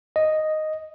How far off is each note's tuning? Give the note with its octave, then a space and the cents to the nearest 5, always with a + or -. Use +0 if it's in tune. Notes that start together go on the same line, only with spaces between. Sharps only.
D#5 +0